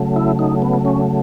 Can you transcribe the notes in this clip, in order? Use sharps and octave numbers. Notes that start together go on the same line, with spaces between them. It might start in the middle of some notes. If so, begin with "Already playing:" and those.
Already playing: C#3 F#3 A3
E4
D#4
B3
C#4